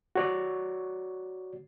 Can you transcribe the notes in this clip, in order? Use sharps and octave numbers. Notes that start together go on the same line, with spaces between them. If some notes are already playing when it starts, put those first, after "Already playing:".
F#4 C#5 D5